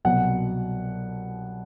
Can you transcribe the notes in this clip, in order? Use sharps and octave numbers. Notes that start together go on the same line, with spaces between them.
C2 B2 F#3 F#5